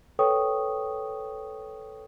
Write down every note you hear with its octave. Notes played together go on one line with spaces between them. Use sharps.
A4 B4 C#5 G5 C#6 D#6